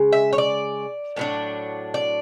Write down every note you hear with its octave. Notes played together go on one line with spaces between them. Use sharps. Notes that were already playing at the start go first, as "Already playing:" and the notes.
Already playing: C#3 G#3
E5
C#5
D5
A2 F#3 B3 D4
D5